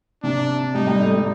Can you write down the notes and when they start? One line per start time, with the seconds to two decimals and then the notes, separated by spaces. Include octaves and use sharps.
0.23 C3 D4
0.74 G3 D#4
0.87 G3
1.00 A3
1.14 G3